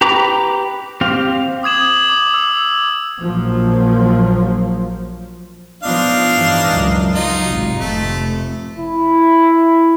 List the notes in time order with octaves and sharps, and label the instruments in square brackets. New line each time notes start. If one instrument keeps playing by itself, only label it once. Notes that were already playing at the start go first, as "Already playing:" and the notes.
[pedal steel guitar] G4 B4 A#5 D6
C4 G4 F5
[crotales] D6 D#6 G#6 E7 F#7
D6
E6
[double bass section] A#1 F3 F#3 A#3
[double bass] F3 B3 [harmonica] D4 D#4 F5
[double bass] G2 E3
C#2 F#2
[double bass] F#3 [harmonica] D#4 F4
[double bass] G#1 C3
[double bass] F1 [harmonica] A3
[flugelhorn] E4